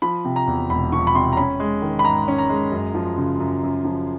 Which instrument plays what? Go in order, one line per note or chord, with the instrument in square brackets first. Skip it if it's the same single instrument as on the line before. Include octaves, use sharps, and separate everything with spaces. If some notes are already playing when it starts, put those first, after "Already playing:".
[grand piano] F3 B5
C3
A#5
E2
E1 B5
F3 C#6
B5
C3 C6
A#5
C#4 B5
G#3
D#3
B5
G#2 A#5
C#4
A#5
G#3
F#2
F3
C#3
F#2
F#2
F3